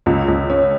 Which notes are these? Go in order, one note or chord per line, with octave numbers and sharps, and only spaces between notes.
C#2
C#2
C#4